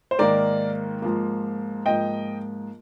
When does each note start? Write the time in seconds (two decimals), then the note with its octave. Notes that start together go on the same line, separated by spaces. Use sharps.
0.11 C5
0.19 G#2 D#3 A#3 A#4 D5
1.02 G#2 F3 A#3
1.86 G#2 F3 A#3 D#5 G5